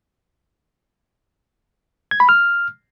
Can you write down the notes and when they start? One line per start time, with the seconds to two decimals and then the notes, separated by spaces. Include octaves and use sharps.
2.11 G#6
2.20 B5
2.29 F6